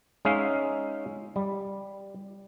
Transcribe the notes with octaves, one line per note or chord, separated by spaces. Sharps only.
G#3 C#4 D#4 E5 F5
G3